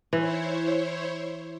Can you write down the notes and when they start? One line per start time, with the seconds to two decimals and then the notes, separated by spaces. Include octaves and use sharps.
0.13 E3 E4 C5 C#5